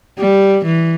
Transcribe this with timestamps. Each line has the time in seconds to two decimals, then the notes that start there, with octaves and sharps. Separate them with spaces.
0.19 G3
0.65 E3